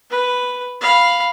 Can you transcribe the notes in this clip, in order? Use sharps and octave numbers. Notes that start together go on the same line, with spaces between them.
B4
F5 B5